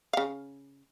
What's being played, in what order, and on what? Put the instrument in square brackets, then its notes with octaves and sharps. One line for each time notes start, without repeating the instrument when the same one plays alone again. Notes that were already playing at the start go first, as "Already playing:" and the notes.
[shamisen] C#3 F5